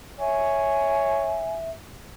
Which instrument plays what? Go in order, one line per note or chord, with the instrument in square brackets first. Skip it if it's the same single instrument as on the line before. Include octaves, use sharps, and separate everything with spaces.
[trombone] C#5 [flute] E5 [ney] G#5